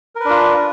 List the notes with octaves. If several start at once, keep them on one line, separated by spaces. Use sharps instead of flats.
D4 F4 A#4 B4